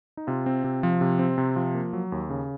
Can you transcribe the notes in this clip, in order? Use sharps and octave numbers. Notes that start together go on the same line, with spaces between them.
D#4
C3 F4
C4
C3
F3
C3
C4
C3
F3
A#3
F#3
D#2
C#3